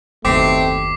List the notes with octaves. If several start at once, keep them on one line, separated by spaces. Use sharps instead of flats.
F#1 D#2 B2 A3 C4 D6 B6 C7